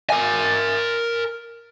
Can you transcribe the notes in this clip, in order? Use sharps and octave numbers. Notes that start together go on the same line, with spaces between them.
A#4 G#5